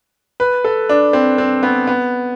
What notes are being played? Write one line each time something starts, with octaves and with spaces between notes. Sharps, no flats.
B4
A4
D4
C4
C4
B3
B3